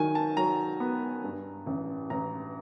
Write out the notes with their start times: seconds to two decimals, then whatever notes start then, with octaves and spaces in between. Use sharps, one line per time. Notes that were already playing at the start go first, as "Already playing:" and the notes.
Already playing: D#3 F#3 G#5
0.15 A5
0.37 F#3 A#5
0.80 B3
1.24 G2
1.66 A1
2.10 A1 A#5